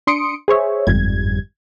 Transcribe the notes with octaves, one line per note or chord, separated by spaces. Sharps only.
D4 C6 D#6 C#7 D7
G#4 C5 C#5 E5
G1 F2 G#2 G3 G#6